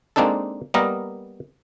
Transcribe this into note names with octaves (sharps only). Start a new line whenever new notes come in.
G#3 A#3 C4 D4 D#4 A4
G3 A#3 B3 A#4 D#5